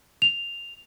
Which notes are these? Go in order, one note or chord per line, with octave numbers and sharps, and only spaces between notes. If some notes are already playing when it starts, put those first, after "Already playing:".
F7